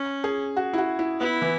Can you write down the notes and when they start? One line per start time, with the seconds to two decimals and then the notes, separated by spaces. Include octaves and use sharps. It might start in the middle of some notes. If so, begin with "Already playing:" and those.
Already playing: C#4
0.24 G#4
0.57 F#4
0.73 E4
0.78 F#4
0.99 E4
1.20 B3 E4
1.42 E3